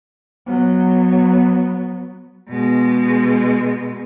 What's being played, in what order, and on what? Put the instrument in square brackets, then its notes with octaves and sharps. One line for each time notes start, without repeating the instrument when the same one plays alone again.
[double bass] F#3 B3
[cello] B2 G#3